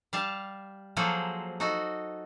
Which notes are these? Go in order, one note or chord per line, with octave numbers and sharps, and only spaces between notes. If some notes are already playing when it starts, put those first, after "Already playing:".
G3 F5 A5
F3 F#3 A#3 G#4 A4 C5
D#4 F#4 A4